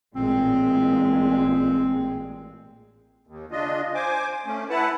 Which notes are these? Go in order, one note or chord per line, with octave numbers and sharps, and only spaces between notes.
A1 A#2 G#3 C4
D#2
C#3 D4 F4 D#5
C5 G#5 D6
A3 C#4
E4 B4 F#5 A5